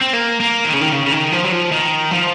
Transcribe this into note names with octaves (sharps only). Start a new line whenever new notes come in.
C4
A#3
A#3
D#3
C#3
D#3
C#3
C#3
D#3
F3
F#3
F3
D#3
F3